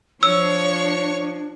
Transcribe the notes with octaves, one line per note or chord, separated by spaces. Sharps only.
F3 D4 C#5 C#6 E6